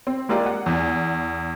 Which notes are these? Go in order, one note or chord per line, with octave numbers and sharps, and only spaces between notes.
C4
G#3 A#3 F4 G4 D5
F#5
E2